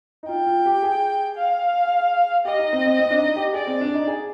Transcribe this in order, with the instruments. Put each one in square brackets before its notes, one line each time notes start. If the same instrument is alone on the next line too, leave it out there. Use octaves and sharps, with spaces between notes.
[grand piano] D#4
[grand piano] F4 [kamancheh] G5
[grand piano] F4
G4
G#4
[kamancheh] F5
[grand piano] G4 [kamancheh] D#5
[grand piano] D#4
C4
C4
C4
D4
D#4
G4
[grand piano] G#4 [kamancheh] D5
[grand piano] C4
D4
D#4
G#4